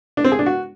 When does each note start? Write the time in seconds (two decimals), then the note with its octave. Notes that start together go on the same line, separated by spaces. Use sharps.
0.17 D4
0.24 C4
0.32 G#4
0.39 D4
0.46 F#4